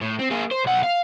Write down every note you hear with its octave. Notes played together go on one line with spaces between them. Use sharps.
A2
C4
A#3 G#4
C5
B1 F#5
F5